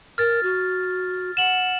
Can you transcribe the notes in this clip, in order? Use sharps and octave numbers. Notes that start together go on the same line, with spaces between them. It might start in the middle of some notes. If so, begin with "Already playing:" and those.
A#4 F6 A6
F#4
F#5 E7 F#7